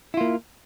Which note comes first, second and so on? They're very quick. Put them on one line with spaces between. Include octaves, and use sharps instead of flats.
E4 F4 A#3